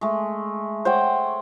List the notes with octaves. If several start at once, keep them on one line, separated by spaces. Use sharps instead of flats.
G#3 A3
C5 C#5 F#5 G5